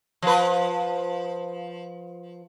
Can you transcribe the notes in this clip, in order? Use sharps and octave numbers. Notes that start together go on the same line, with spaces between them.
F3 B4